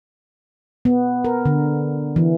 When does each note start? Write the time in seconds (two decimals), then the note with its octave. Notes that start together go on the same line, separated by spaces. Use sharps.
0.85 B3
1.25 A#4
1.45 D3
2.16 E3